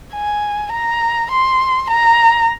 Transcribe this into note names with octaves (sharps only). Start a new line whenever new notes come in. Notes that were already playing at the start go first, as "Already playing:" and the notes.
G#5
A#5
C6
A#5